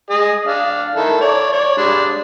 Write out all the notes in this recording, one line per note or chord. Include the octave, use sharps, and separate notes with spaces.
G#4 D#5 D#6
D4 F5
D#3 E4 A4
C#5 D5
C#5 D5
G3 G#3 D4